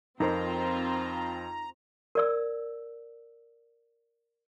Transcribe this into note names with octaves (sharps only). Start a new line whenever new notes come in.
F2 C4 D#4 F4 A#4 C5 A#5
A#4 D5 E6